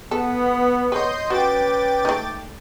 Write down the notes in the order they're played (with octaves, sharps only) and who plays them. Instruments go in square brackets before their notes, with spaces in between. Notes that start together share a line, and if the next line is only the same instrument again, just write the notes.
[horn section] B3 [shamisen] A4
[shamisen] B4 C#5 [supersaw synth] D#5 C6 G6
[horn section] C#4 B4 [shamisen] F#4 [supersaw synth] G5 D6 A6
[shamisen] A3 D#4